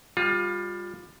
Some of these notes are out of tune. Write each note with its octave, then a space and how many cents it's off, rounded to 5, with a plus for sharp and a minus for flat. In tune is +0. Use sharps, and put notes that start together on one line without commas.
G3 +20 F4 +25